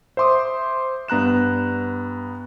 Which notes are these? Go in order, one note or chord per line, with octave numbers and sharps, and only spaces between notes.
C5 E5 C6 D6 D#6
G2 B3 A#5 F#6 E7